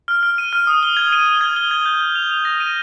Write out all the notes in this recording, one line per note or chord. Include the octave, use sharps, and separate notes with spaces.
F6
F6
D#7
F6
D#6
G7
G#6
D#7
G7
G#6
G7
G#6
G6
G6
F7
F7
A#6
D#7